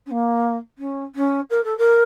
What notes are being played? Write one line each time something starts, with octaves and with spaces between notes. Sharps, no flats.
C#4
A#3
C#4
C#4
A#4
A4
A#4